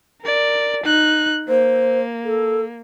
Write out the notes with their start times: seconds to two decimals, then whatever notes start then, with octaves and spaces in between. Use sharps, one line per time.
0.22 A#4 D5
0.84 D#4 F#6
1.49 A#3 C5
2.25 A4